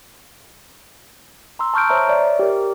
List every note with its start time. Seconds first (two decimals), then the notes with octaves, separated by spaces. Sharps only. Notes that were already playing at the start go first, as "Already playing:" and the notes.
1.59 A#5 C6 E6
1.74 A5 C#6 F6 G6 D7
1.90 C5 C#5 E5 A#5
2.08 C#5 D5 E5
2.39 G4 A#4